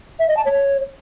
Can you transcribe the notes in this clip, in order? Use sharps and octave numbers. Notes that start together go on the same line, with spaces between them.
E5
D#5
A5
C#5